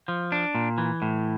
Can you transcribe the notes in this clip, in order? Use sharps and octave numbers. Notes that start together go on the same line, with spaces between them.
F3
D4
A#2
E3
A2